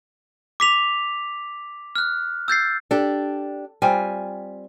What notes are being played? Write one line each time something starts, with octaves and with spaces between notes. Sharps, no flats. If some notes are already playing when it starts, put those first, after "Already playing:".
D6 B6 F7
F6 F#6
E6 G6 A6 C7
D4 G4 A4
G3 C4 F4 G#5